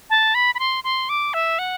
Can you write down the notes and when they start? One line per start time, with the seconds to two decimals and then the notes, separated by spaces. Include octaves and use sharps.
0.10 A5
0.35 B5
0.55 B5
0.59 C6
0.84 C6
1.09 D6
1.34 E5
1.59 F#5